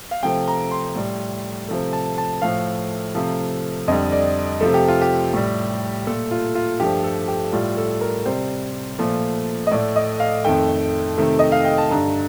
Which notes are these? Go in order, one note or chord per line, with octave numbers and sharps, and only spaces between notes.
F5
C3 F3 A3 G5
A#5
C6
A2 G3
C3 F3 A3
A5
A5
A2 F3 A3 F5
C3 F3 A3
F2 D3 G3 D#5
D5
C3 F3 A3 A4
G4
F4
G4
A2 G3
A#2 A3 A4
F4
F4
G2 F3 A3 G4
A4
G4
A2 G3 F4
A4
A#4
C3 G3 C5
A#2 F3 A3
D#5
A2 A3 D5
D#5
F5
F2 D#3 A3 G5
C3 D#3 A3
D#5
F5
G5
A5
G2 D3 A3 A#5